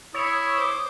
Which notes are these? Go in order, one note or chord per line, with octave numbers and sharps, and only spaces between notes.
E4 C#5 D#6
C5 D6